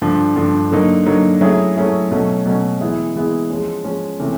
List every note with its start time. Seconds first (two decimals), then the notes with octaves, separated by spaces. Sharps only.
0.02 G2 D3 F3
0.36 G2 D3 F3
0.71 D3 F#3 A#3 D#4
1.06 D3 F#3 A#3 D#4
1.41 F#3 A3 C#4 E4 G#4
1.76 F#3 A3 C#4 E4 G#4
2.11 B2 F#3 A3 C#4
2.46 B2 F#3 A3 C#4
2.80 E3 G#3 B3 E4 G#4
3.15 E3 G#3 B3 E4 G#4
3.50 F3 G#3 C#4
3.84 F3 G#3 C#4
4.20 C3 E3 A3 C#4